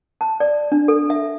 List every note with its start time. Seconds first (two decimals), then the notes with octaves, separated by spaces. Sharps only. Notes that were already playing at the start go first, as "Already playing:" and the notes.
0.21 A5
0.40 D5
0.72 D4
0.88 A4
1.10 E5